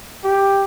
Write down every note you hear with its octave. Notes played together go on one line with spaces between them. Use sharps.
G4